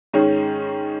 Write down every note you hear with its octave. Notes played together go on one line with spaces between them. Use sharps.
G#2 D#3 G#3 C#4